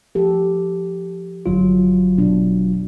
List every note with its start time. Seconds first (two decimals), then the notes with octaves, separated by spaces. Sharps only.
0.15 F3 G4 A4
1.46 G1 F#3 F4
2.18 B2 D4